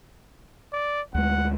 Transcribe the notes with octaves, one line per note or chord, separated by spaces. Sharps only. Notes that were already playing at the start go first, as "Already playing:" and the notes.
D5
D2 G#3 F#5